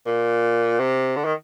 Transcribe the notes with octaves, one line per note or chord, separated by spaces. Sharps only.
A#2
C3
D3
D#3